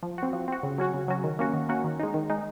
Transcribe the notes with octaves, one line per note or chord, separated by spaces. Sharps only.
F3
C4 F#4
F3
C4 F#4
C#3
F#3 C#4 F#4
C#3
F#3 C#4 F#4
D#3
A#3 C#4 F#4
D#3
A#3 C#4 F#4
D#3
G#3 D#4
D#3
G#3 D#4